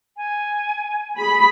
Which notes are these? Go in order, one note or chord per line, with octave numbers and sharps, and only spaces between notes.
G#5
G#4 B5